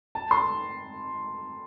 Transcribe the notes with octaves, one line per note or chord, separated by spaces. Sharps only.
A5
C6